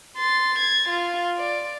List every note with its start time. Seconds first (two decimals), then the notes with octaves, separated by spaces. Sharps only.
0.16 C6 A6
0.58 G#6 A6
0.89 F4
1.38 D5